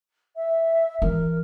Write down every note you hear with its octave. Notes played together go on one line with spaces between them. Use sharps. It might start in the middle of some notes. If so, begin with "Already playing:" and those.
E5
E3 A#4